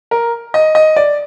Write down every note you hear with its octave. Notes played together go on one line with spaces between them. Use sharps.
A#4
D#5
D#5
D5